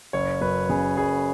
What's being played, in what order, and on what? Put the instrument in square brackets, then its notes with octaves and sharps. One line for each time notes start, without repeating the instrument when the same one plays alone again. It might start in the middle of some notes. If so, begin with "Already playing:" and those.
[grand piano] F#1 C#5
F#2 B4
C#3 G#4
F#1 G#4